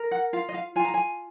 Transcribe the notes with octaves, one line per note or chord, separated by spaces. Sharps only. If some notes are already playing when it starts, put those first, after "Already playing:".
Already playing: A#4
F#5
F4 F5
D#5
F5
F4 G#5
A#5
G#5